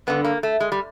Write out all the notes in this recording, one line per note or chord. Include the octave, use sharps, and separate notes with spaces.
G2 D3 B3
A#3
A3
G#3
G3